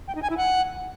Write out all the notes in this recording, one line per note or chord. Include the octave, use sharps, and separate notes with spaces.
G5
D#4
G#5
E4
F#5